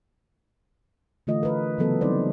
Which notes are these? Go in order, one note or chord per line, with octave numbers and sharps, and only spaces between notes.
D3 E3 A3 F4 D#5
A#4 B4
C#3 E3 F#3 B3 A4 A#4
F#3 G3 C4 D#4 C5 D5